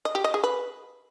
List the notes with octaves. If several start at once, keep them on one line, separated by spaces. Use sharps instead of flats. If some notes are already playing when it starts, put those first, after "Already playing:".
D#5
G4
D#5
G#4
B4